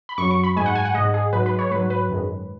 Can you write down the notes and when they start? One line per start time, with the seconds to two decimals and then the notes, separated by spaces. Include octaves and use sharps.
0.09 B5
0.18 F#2 F#3 C#6
0.31 C#6
0.44 B5
0.56 G#2 G#3 G#5
0.66 F#5
0.75 G#5
0.85 F#5
0.94 G#2 G#3 D#5
1.14 G#4
1.33 G#2 F#3 B4
1.46 B4
1.59 C#5
1.71 G#2 F#3 B4
1.90 B4
2.10 F#2 D#3 G#3